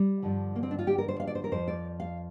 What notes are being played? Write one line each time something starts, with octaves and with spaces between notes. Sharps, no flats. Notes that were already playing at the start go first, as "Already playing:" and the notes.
Already playing: G3
G2 D3 F3
A#3
C4
D4
F4
G4
A#4
C5
F5
D5
C5
A#4
F2 F3 C5
D5
F5